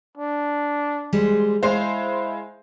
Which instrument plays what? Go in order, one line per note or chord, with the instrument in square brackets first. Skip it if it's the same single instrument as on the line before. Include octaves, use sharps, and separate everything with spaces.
[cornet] D4
[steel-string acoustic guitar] G3 G#3 C5
[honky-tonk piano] G#3 C5 [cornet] E4 [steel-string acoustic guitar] F5